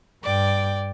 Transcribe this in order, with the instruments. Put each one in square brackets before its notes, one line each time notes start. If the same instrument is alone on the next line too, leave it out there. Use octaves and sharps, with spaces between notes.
[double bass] G2 [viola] D5 G5